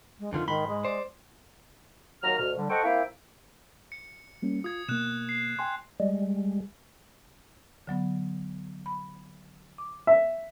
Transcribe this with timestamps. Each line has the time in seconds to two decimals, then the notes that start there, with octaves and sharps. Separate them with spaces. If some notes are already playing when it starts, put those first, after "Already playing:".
0.19 G#3
0.33 F2 D3 D#3 F4
0.48 G#2 D#3 B5 C6
0.67 G#3
0.85 C5 D5
2.23 D#2 F#3 A#4 A#5 F6
2.39 D2 B2 F6
2.58 D3 G3
2.70 A4 C5 D#5 F#5 G5 C#6
2.84 A#3 C4 E4 E5 F5 G5
3.92 C#7
4.42 G3 A#3 C#4
4.64 F4 D#6 G#6
4.89 B2 A#3 F#6 E7
5.29 C7
5.59 G5 G#5 C6
6.00 G3 G#3
7.87 D3 F#3 B3
8.86 B5
9.78 D6
10.07 E5